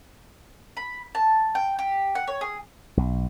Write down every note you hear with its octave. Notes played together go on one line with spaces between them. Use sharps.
B5
A5
G5
G4
F#5
C#5
G#4
B1